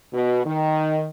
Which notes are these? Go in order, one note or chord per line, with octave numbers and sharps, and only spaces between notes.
B2
D#3